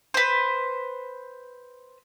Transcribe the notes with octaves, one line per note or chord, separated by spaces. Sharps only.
B4 C5